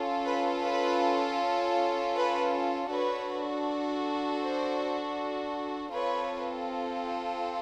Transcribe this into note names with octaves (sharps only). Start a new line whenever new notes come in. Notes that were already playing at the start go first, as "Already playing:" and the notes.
Already playing: C#4 F4 A4
B4
B4
B4
D4 F#4 A4 B4 C#5
C5 D5
C4 F4 A4 B4 C#5